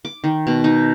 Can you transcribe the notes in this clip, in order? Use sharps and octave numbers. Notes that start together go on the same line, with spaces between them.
D6
D#3
B2
D#4